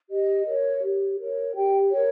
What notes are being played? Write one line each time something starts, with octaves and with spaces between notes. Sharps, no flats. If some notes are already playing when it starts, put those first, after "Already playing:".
G4 D#5
A#4 C#5
G4
A#4 C#5
G4 G5
A#4 C#5